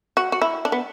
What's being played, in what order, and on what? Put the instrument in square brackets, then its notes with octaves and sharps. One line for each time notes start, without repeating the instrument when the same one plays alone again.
[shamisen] F#4
F#4
E4
D4
B3